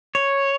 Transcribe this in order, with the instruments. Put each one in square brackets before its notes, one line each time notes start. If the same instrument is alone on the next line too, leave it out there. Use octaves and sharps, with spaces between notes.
[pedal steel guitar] C#5